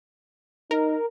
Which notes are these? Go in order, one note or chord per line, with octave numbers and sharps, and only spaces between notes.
D#4 A#4